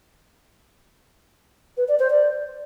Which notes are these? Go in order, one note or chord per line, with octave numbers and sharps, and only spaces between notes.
B4
D5
C5
D5